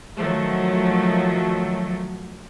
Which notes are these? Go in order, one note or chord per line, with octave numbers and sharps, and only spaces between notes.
D#3 F3 F#3 A3